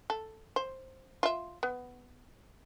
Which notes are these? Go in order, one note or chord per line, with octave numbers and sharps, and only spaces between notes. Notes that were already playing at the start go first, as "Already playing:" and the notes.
A4
C5
F4 E5
B3